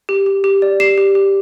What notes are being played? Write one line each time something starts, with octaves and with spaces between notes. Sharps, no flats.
G4
G4
G4
D5
G4 C7 E7
G4
G4